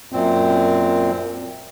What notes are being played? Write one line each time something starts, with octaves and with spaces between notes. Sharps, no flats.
F#2 A#2 C4